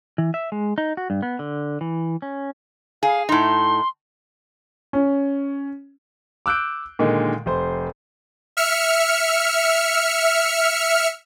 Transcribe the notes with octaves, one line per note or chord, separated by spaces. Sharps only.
E3
E5
G#3
D#4
F#4
G2
B3
D3
E3
C#4
G#4 F5
A2 D#4 C6
C#4
D6 E6 F#6 G6 D7
A#2 D3 D#3 G#3
F1 C5 C6
E5 F6 C#7